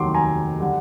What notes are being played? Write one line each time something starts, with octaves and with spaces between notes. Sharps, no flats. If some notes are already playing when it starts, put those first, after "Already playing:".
Already playing: F1 D#2 D#3 F#3 C6 D6
G#5 A#5
D3 G3